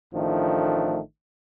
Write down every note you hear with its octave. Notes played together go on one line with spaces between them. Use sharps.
A1 D#3 F3 A3 D4